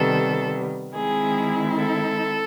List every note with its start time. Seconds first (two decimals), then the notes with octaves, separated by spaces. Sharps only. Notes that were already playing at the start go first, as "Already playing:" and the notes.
Already playing: C3 D#3 G3 B3 A4
0.93 D#3 G#3 C4 E4 G#4
1.77 A4